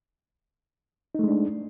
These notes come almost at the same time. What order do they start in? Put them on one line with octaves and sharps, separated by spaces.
D#4 A3 G#3 D4